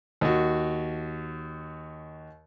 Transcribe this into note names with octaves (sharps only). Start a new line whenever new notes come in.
D#2 F#4